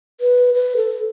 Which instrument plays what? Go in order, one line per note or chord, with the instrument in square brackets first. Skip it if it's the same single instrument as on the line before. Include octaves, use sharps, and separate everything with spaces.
[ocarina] B4
B4
A4